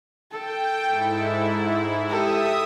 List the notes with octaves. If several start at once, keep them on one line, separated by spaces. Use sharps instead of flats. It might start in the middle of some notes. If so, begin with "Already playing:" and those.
A4 G5
G#2 E4
G4 A4 E5 D#6